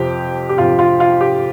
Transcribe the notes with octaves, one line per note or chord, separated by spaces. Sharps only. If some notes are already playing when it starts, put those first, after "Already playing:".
Already playing: F2 C3 F3 G4
G4
F2 C3 F3 F4
F4
F4
G4